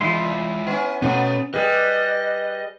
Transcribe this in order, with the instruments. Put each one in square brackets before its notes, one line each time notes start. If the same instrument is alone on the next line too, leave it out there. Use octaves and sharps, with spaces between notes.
[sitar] E2 [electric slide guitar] G#3 F4 G#4 [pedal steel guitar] E4 C6
[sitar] B3 C#4
[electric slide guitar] B2 [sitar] A3 B3 [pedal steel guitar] C#4
[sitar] G3 G#4 [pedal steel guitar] B4 [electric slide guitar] D#5